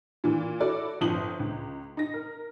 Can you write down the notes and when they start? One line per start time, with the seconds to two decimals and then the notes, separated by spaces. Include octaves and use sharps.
0.24 A#2 E3
0.60 E4 F#4 A4 D5
1.01 G1 F3 C4 D#6 F#7
1.40 C#2
1.97 D#4 A#6
2.14 A#4